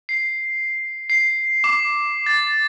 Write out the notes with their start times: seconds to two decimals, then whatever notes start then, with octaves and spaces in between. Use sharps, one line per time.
0.09 C7
1.10 C7
1.64 D6
2.26 A6